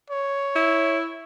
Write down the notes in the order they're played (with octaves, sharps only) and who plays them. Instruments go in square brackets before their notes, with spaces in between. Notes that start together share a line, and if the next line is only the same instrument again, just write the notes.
[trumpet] C#5
[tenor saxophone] E4